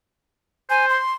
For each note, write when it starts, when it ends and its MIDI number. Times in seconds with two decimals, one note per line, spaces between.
0.70 0.98 72
0.70 0.85 80
0.90 1.12 84